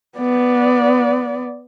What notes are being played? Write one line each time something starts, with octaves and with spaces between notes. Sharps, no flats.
B3 D5